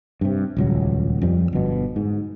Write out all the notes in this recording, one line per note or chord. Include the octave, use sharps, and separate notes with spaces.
G2 C3
D#1 C#2 F#3
F2 F3 G3
G1 B2
G#2